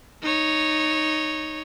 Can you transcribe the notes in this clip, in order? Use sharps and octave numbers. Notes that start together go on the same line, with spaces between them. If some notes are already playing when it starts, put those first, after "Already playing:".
D#4 C#5